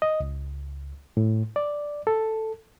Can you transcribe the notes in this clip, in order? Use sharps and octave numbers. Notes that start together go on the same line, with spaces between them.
D#5
C#2
A2
D5
A4